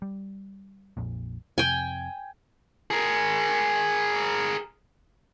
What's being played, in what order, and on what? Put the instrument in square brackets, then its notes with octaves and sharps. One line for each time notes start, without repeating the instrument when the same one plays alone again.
[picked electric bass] G3
A#1 F2 A#2
[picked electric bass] F2 C3 [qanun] G5 G#5
[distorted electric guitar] G#4 A#4